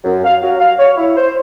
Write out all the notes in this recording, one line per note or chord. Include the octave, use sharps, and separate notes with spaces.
F#2
F5
F#3
F5
C#5
E4
C5